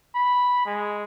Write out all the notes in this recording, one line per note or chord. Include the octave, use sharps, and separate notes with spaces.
B5
G#3